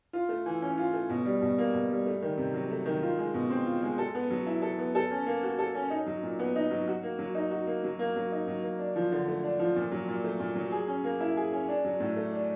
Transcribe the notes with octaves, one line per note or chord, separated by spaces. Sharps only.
F4
A3
E3
C#4
F4
A3
B2
G3
B2
A#3
B2
G3
A3
D#3
C3
F#3
A3
D#3
F4
G#3
B2
C4
F4
G#3
A4
B3
F#3
E4
A4
B3
A4
C#4
A#3
F#4
A4
C#4
D#4
F#3
A#2
B3
D#4
F#3
F#4
A#3
F#3
D#4
F#4
A#3
F#3
A#3
F#3
D#4
F#3
A#3
D4
F3
D3
A3
D4
F3
A#2
F#3
A#2
A3
A#2
F#3
G#4
C#4
A#3
E4
G#4
C#4
D4
F#3
A2
A3
D4